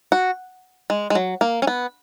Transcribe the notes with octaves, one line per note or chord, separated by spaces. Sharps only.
F#4
G#3
G#3
F#3
A#3
C#4
B3